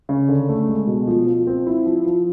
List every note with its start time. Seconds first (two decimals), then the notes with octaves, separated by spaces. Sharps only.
0.09 C#3
0.29 D3
0.49 A3
0.68 G#3
0.87 B2
1.07 F3
1.27 F3
1.47 C4
1.67 E4
1.86 F3
2.06 F3